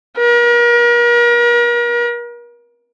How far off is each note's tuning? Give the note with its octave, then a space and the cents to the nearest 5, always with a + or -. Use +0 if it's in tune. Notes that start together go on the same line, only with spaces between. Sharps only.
A#4 +40